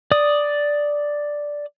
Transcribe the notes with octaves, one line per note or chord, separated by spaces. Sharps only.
D5 D#6